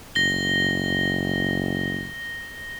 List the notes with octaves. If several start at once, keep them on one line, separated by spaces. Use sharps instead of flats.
F#1 A#6 G7